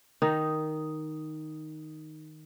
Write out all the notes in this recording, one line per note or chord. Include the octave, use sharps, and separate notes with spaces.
D#3 D#4